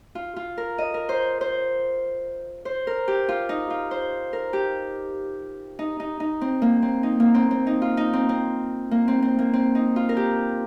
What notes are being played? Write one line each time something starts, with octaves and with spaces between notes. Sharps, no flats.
F4
F4
A#4
D#5
A#4
C5
C5
C5
A#4
G4
F4
D#4
F4
C5
A#4
G4
D#4
D#4
D#4
C4
A#3
C4
D#4
A#3
C4
C4
D#4
F4
D#4
C4
C4
A#3
C4
C4
A#3
C4
D#4
F4
A#4
G4